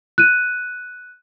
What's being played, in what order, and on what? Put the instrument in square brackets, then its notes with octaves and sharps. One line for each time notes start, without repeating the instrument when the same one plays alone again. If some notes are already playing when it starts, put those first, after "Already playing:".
[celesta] F#6 D#7